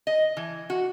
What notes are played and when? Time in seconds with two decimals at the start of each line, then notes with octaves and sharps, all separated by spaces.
0.07 D#5
0.37 E3
0.70 F#4